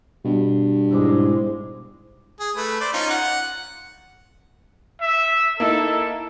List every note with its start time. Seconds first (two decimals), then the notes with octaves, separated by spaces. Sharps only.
0.25 G2 B2
0.91 G#2 G#3 E4 C5 D6
2.40 G#4
2.56 A3 B4
2.81 C5 D5
2.93 C#4 D#4 F4
3.10 F#5
5.01 E5
5.60 A#3 D#4 E4 A4